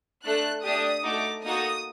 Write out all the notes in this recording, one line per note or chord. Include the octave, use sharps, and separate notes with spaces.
A3 D4 A4 F#6
A3 D4 G4 D#6
A3 D#4 F#4 A4 D6
A#3 D#4 F#4 A4 D#6